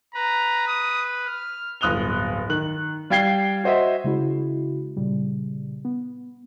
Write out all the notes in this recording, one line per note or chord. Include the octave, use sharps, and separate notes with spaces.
B4 A#5
D#6
F6
D1 G1 D#6 F#6 F7 G7
D#3 F#6 F#7
G3 F5 G5 G#6 C7 G7
F#4 C5 D#5 E5
C#3 G#3 E4 F#4
A#2 C#3 G3
B3